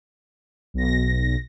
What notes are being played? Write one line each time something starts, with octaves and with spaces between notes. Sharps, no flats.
B1 A#6